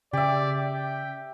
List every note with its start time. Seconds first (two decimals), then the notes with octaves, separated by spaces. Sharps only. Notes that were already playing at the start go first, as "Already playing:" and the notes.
0.13 C#3 G4 D5 E5
0.57 G5